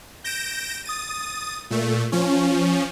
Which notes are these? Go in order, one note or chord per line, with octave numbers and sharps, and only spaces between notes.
G6 A#6 D7 E7
D#6 A6 D#7
A#2 A3
F3 C#4